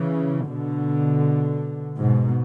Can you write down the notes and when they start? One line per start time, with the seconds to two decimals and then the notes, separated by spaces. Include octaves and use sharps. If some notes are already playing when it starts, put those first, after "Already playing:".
Already playing: C#3 E3
0.48 B2 D3
1.98 G#2 B2